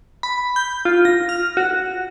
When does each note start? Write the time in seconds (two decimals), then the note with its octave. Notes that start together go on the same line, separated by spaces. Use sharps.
0.23 B5
0.56 G6
0.85 F4
1.05 A#6
1.29 F6
1.57 F#4